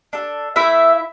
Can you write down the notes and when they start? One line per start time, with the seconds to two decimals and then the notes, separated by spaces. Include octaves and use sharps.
0.13 D4 A4
0.56 A3 E4 E5